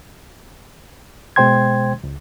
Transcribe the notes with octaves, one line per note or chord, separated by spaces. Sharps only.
B2 G#3 C5 G5 C6 G#6
C#2